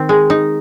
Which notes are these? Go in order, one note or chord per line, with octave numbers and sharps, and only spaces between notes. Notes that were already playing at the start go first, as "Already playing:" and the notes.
Already playing: D#3 C4
G#3
D#4